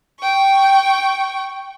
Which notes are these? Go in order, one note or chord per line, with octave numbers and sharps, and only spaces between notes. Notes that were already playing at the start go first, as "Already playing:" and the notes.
G5 C#6